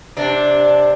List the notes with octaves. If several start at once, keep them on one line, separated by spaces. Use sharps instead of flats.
C3 D4